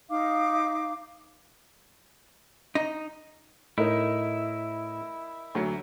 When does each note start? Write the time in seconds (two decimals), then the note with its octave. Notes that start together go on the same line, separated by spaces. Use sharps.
0.09 D#4 F5 D6
2.75 D#4
3.78 A2 D#4 E4 A#4 D#5
5.55 D2 F#3 C#7